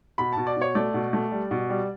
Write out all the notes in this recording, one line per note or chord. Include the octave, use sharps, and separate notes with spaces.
B2 B5
B2 A5
D5
B2 C#5
A3 D5
B2
A3
G3
B2
G3